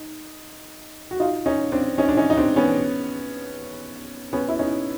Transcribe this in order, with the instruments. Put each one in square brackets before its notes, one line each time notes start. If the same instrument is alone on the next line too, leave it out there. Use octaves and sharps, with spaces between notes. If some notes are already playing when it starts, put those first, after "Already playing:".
Already playing: [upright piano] D#4
F#4
D#4 F4
C#4 D#4
C4 D4
C#4 D#4
D4
C#4 D#4
D#4
C4 D4
B3 C#4
B3 C#4
E4
C#4 D#4